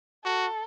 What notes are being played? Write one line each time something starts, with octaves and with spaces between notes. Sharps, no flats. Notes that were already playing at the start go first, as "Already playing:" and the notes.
F#4 A4